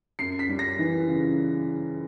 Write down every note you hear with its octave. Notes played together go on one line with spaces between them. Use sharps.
F#2 C7
B6
G3
A#6
E3
C#3